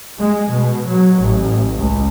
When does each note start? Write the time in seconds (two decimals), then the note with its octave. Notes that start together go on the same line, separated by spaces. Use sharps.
0.18 G#3
0.51 B2
0.86 F#3
1.20 A1
1.77 C#2